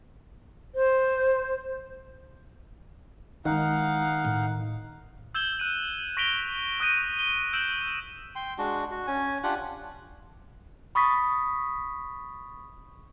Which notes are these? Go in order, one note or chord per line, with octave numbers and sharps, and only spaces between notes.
C5
D#3 G#3 D#4 E4 F5 F#5
A2
E6 G6 G#6 E7 F#7 G7
F#6 D#7
C#6 A#6 B6 D7 F7 G7
C#6 D#6 F#6 G6 A#6 D#7
G7
E6 G6 D7 E7 F#7
G5 C6
G#3 D4 F#4
F#4
C#4 G#5
D4 F4 G4 F#5
B5 C#6 D#6 A6 B6